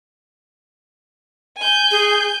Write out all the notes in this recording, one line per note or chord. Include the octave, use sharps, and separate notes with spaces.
G#5 G6
G#4